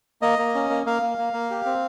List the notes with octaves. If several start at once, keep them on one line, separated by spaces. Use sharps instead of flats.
A#3 D#5
A#3
C#4
A#3
A#3 F5
A#3
A#3
A#3
G4
C4